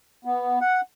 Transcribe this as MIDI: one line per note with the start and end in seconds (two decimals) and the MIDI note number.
0.25 0.59 59
0.61 0.81 78